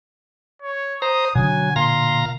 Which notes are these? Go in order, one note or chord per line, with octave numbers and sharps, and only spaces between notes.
C#5
C5 A#5 D#6
B2 D3 F#3 D4 G#5
A#2 F5 A#5 C6